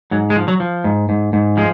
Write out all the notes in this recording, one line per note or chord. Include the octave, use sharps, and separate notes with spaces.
G#2 F#3
G#3
F3
F#3
F3
G#2
G#2
G#2
F3 G#3